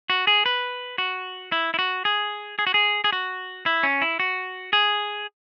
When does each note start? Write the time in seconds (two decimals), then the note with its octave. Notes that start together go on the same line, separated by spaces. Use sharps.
0.10 F#4
0.27 G#4
0.46 B4
0.98 F#4
1.52 E4
1.74 E4
1.79 F#4
2.05 G#4
2.59 G#4
2.67 F#4
2.74 G#4
3.04 G#4
3.12 F#4
3.66 E4
3.83 C#4
4.02 E4
4.20 F#4
4.73 G#4